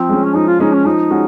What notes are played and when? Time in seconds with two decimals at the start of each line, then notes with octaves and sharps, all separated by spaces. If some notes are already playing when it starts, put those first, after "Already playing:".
Already playing: F3 C4
0.09 G#3 C#4
0.24 C#4
0.34 F3 D#4
0.47 F4
0.59 G#3 C#4 D#4
0.73 C#4
0.86 F3 D#4
1.10 G#3 C#4 F#4